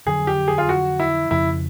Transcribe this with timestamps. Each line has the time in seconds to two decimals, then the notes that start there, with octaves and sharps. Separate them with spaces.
0.06 F2 D3 F#3 G#4
0.27 G4
0.48 G#4
0.58 F4
0.69 F#4
1.00 E4
1.31 F2 C#3 F3 E4